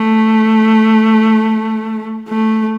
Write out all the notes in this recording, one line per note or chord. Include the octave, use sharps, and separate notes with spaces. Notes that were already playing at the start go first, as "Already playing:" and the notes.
Already playing: A3
A3